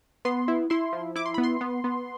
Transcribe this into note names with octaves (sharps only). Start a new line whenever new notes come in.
B3 C6
E4
E4 C6
F3
E4 D6
C6
B3 B5
C6
B3
B3